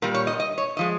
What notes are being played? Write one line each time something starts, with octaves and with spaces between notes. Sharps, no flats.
A#2 G3 A#4
C#5
D#5
D#5
C#5
F3 G#3 D#5